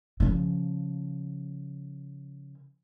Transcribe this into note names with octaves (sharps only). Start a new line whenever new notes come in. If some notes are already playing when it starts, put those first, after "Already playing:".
C#3 F3